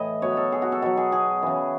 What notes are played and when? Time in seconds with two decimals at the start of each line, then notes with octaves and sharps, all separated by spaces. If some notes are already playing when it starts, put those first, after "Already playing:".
Already playing: A2 E3 D#5
0.22 B2 F#3 C#5
0.37 A4
0.52 G#4
0.62 F#4
0.72 A4
0.82 B2 F#3 A4
0.97 G#4
1.12 G#4
1.43 C#3 E3